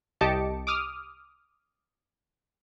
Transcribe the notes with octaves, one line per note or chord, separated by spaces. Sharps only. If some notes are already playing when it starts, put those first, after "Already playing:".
C2 G4 D#5 A5 D6 C#7
D6 D#6 F6